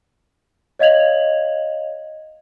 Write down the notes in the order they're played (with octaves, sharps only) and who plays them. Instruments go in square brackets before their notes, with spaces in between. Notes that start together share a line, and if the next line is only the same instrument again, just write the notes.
[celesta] C#5 D#5 F5 G#6 F7 F#7